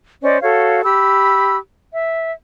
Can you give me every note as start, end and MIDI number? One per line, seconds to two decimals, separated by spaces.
0.22 0.39 61
0.22 0.39 72
0.22 0.39 74
0.22 0.39 75
0.41 0.82 66
0.41 0.82 69
0.41 0.82 73
0.41 0.82 77
0.84 1.56 67
0.84 1.56 83
0.84 1.56 88
1.92 2.31 76